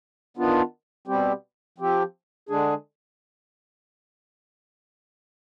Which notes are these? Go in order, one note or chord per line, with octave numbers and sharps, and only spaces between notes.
D#3 B3 D4 F4
B2 G3 C4 G4
F3 C4 G4
D3 G#3 D4 G#4